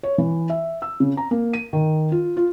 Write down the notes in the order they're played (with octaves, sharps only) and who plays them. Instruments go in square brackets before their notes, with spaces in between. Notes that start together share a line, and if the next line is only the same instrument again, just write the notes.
[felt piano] C#5
E3
E5
E6
C#3
A#5
A#3
D#7
D#3
F4
F4